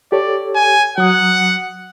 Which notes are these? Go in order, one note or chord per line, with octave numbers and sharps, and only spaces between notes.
G4 A4 C#5 D5
G#5
F#3 F#5 D#6